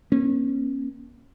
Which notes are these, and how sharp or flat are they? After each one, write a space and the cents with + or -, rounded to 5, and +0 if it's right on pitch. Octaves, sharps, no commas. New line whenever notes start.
A#3 +35 C#4 -25